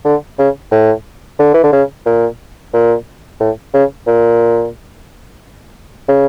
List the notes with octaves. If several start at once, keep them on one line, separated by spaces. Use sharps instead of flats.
D3
C#3
A2
D3
E3
D3
C#3
A#2
A#2
A2
C#3
A#2
C#3